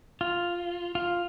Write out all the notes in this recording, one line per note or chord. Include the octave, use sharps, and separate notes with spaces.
F4
F4